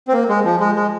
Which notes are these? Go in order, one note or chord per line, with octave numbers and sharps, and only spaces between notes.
C4
A#3
G#3
F3
G#3
G#3